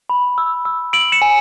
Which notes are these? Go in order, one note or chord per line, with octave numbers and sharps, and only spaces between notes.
B5
E6
E6
E6 D7 F#7
C#7 E7
G#5